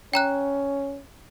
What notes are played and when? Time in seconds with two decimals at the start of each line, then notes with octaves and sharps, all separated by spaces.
0.14 C#4 G5 A#5 F#6